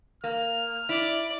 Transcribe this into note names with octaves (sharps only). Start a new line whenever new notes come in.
A#3 F6
E4 D5